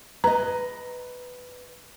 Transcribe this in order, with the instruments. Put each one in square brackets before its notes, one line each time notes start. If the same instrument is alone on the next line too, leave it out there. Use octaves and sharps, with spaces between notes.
[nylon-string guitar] B4 D#5 [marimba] A#5